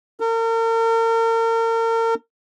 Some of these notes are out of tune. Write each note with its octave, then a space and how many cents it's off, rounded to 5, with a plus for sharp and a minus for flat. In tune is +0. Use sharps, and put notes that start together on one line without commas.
A#4 -40